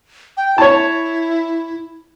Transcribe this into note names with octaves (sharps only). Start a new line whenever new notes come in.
G5
E4 C#5 A5